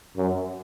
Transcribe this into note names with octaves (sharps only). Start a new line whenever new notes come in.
F#2